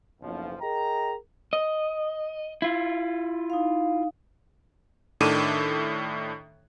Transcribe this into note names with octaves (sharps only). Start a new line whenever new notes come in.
F#1 B1 F3
G#4 A#4 D#5 G5 A#5
D#5
E4 F4
D#4 F5
A2 D#3 D4 A4 D6 D#7